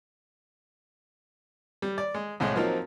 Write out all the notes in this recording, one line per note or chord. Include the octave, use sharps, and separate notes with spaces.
G3
D5
G#3
C2 A2 G#3
F3 F#3 A#3 C4 D#4